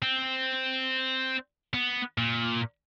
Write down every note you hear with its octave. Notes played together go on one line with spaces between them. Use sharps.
C4
B3
A#2